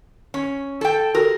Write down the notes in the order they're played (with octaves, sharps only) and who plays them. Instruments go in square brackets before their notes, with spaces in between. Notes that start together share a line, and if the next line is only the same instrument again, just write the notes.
[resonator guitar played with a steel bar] C#4
A4 G5
[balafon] F#4 G4 A4 [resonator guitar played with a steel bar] A#4